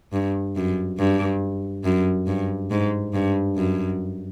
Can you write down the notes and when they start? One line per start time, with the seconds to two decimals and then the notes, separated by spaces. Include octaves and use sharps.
0.13 G2
0.56 F#2
0.99 G2
1.84 F#2
2.27 G2
2.71 G#2
3.14 G2
3.57 F#2